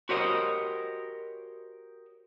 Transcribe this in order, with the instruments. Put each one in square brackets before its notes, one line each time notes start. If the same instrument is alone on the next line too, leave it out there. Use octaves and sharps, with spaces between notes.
[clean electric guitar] F#4 G4 A#4 C5 C#5 D#5